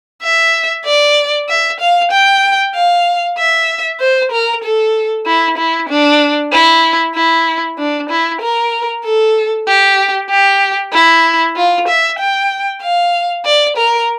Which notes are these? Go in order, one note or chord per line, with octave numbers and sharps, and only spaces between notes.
E5
D5
E5
F5
G5
F5
E5
C5
A#4
A4
E4
E4
D4
E4
E4
D4
E4
A#4
A4
G4
G4
E4
F4
E5
G5
F5
D5
A#4